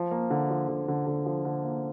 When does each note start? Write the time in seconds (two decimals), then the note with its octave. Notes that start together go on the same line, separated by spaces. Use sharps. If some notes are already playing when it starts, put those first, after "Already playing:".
Already playing: F3
0.11 A#3
0.30 D3
0.50 F3
0.68 D3
0.88 D3
1.07 D3
1.26 F3
1.45 D3
1.64 A#3